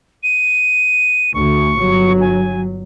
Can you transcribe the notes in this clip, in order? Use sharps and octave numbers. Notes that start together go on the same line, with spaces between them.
D#7
D2 C#6
G1 F#3
G#5